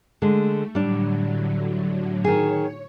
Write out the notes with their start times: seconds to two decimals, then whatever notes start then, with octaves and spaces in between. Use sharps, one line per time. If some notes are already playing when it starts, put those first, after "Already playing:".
0.22 D3 G#3 A3
0.75 A2 D3 F#3 G3 D4
2.24 D#3 G#4 C#5